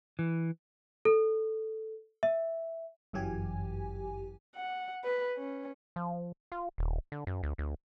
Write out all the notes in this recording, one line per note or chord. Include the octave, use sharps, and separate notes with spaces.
E3
A4
E5
G1 F#2 E3 F#3 G4 G#5
F#5
B4
C#4
F3
F4
D#1
D3
F#2
D2
D2